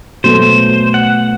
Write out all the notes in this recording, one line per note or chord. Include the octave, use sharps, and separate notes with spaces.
B2 F#3 A3 C5
F#5